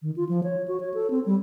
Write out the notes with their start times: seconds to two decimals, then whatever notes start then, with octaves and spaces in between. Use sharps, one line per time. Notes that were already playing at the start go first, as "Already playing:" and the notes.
0.02 D#3
0.16 F4
0.29 F3
0.43 C#5
0.68 F#4
0.80 C#5
0.94 A4
1.10 C4
1.26 G3